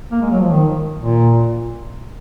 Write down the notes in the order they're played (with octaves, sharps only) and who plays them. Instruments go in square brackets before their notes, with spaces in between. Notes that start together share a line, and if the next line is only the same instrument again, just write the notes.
[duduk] A#3
G#3
F#3
F3
D#3
A#2